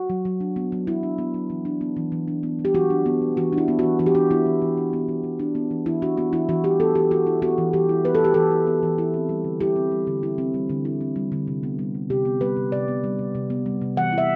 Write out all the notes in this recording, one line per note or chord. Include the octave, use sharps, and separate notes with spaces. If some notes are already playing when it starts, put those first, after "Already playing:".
Already playing: F#4
F#3
F#3
D4
B3
F#3
F#3 E4
D4
B3
F#3
E3
D4
B3
E3
E3
D4
B3
E3
G4
E3 F#4
D4
B3
E3
E3 F#4
D4
E4
B3
E3 F#4
E3 F#4
G4
D4 F#4
B3 E4
E3
E3
D4
B3
E3
E3
D4
B3
E3
E3 E4
D4 F#4
B3 F#4
E3 E4
E3 F#4
E4 G4
B3 A4
E3 G4
E3 F#4
E4
B3 F#4
E3
E3 G4
E4
B3 B4
A4
E3 G4
E3 A4
E4
B3
E3
E4
C4
G3
D3
E4 G4
C4
G3
D3
E4
C4
G3
D3
E4
C4
G3
D3
C3
B3
G3
C3
C3 G4
B3
G3 B4
C3
C3 D5
B3
G3
C3
C3
B3
G3
C3
E3 F#5
E4
E5